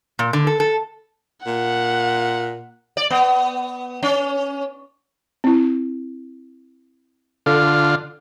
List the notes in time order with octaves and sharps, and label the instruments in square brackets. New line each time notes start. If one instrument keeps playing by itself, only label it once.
[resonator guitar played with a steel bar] A#2
D3
A4
A4
[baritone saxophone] A#2 [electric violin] F#5
[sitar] D5
B3
C#4
[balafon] C4 E4
[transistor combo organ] D3 F4 [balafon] A4